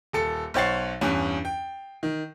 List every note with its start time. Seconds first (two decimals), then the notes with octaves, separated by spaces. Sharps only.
0.13 D#1 A4 C#7
0.54 B1 C5 C#5 F#5 A6 C7
1.01 E2 G2 C#4
1.45 G5
2.03 D#3